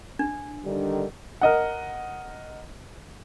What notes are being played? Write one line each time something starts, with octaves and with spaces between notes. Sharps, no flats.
D4
D3 D#3 G3
A#4 D#5 F#5